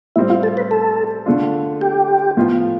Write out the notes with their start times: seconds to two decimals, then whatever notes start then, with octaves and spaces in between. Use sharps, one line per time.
0.16 A2 G3 C4 E4
0.30 F4
0.43 A4
0.57 B4
0.71 A4
1.26 D3 A3 D4 F4
1.81 G4
2.37 A2 F3 B3 F4